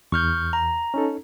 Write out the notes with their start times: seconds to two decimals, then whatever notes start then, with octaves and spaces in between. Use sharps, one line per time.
0.12 E2 C#6 F6 G6
0.53 A#5
0.94 C#4 D#4 A4